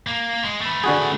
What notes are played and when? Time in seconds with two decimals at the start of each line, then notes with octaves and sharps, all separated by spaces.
0.07 A#3
0.44 G#3
0.61 A3 B4
0.84 D3 F#4 G#4